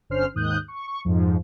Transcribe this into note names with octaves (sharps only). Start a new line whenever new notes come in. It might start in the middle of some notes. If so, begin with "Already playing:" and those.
G1 D3 C#4 C5 F6 C7
D#2 G#2 D#6 F#6 G6
C#6
C#6
F2 G#2 F3